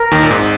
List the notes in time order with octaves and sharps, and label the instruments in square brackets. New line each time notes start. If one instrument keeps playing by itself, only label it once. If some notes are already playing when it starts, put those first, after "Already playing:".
Already playing: [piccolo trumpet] A#4
[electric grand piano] D#2 D#3
A#2
G#1 G#2